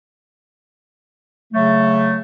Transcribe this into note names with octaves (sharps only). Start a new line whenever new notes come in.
C#3 F#3 A3